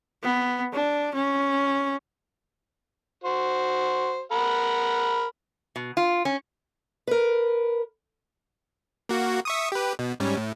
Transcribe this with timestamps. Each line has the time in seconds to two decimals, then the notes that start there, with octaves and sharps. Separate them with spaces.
0.23 B3
0.73 D4
1.15 C#4
3.24 F#4 C5
4.32 A#4 F#5 B5
5.76 B2
5.97 F4
6.25 C#4
7.07 A#4 B4
9.09 A#3 F#4
9.45 E5 C#6 D#6
9.72 G4 B4
9.99 B2
10.20 G#2 G3 C#4
10.37 A2